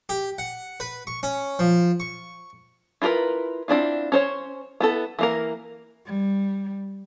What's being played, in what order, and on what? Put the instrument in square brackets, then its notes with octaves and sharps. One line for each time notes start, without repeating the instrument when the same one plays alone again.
[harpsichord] G4
F#5
B4
C#6
C#4
F3
C#6
[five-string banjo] E4 F4 G#4 A#4 B4
C4 D4 E4 F4
C#4 C5 C#5
B3 E4 A4
E3 A#3 A#4
[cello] G3